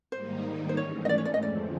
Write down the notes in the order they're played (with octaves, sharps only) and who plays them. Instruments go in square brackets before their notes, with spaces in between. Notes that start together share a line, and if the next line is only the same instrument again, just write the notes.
[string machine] G#2 D#3 G3 A#3 D#4 [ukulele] C5
[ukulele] C5
[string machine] G#2 E3 A3 C#4 [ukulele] C#5
[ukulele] D#5
D5
C#5
D5
D#5
[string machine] F2 D3 F3 G#3 C4 [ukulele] D5